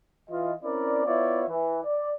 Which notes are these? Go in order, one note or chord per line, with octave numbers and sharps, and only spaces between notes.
E3 F4 D#5
C4 C#4 E4 A#4 D5
B3 E4 F4 C#5 D5 E5
E3
D5